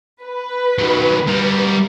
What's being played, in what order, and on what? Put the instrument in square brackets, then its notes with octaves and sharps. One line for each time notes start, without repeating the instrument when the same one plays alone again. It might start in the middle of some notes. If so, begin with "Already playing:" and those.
[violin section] B4
[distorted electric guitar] D#3 F#3
G3 A#4